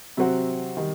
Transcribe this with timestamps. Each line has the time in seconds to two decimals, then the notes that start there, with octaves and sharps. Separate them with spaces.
0.17 C3 F#3 C4 F#4
0.77 D#3 G3